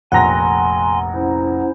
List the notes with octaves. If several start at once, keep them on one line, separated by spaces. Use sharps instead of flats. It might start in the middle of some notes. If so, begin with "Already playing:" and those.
F1 A#1 F#5 G#5 A#5 C6 A#6
C#4 E4 C5